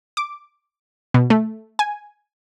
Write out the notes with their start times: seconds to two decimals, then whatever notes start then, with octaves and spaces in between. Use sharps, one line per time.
0.17 D6
1.14 B2
1.30 A3
1.79 G#5